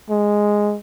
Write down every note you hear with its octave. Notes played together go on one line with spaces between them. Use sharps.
G#3